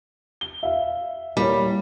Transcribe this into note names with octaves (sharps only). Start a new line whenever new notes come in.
G7
E5 F5
G3 A#3 E4 C#5